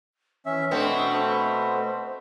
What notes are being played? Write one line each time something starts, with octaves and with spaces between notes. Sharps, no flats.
E3 C#4 E5
B2 A3 B3 C4 D4
C5